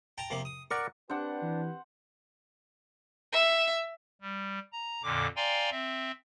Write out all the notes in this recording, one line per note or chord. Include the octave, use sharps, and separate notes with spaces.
G5 A5 A#5
C3 F3 A#3
D#6
A#4 D5 F#5 C#6
C4 D4 G4 B4 C5 F#5
E3
E5
G3
A#5
F2 A#2 D3 D6
D5 F5 G5 G#5 A#5 C6
C4 E5